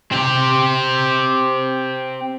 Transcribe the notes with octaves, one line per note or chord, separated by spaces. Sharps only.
C4 G4